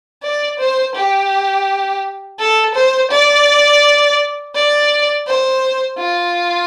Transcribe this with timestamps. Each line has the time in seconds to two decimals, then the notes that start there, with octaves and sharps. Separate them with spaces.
0.23 D5
0.59 C5
0.95 G4
2.39 A4
2.75 C5
3.11 D5
4.55 D5
5.27 C5
5.99 F4